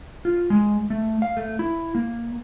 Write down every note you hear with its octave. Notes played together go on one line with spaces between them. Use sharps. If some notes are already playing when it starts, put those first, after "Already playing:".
F4
G#3
A3
F5
A3
E4
A#3